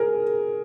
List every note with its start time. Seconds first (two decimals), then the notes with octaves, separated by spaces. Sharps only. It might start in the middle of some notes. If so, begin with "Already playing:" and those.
Already playing: G#4 A#4